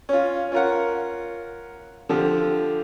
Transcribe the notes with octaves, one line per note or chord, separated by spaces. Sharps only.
C#4 F4
C#4 F4 A#4 F#5
D3 F3 G4